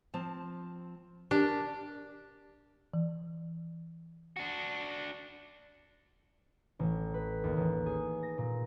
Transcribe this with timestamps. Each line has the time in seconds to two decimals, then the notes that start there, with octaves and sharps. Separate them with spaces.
0.14 F3 C4 A5
1.31 D4 G4 A#4
2.94 E3
4.36 D4 F#4
6.79 A1
7.14 B4
7.44 D#2
7.57 A1
7.86 G#4
8.23 A#6
8.38 A#2